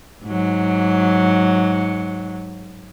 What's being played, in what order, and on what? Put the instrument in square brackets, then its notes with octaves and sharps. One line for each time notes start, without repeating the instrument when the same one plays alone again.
[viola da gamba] G#2 F#3